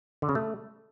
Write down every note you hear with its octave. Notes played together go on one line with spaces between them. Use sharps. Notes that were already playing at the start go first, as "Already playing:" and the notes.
D3
C#3
A3